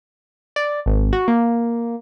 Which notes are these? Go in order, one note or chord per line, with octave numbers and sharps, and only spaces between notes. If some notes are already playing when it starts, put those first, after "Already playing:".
D5
G#1
F#4
A#3